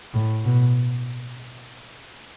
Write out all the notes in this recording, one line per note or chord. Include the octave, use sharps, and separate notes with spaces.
A2
B2